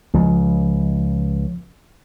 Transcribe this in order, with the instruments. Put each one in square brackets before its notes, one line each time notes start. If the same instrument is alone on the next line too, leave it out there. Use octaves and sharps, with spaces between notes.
[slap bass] C#2 [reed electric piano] F3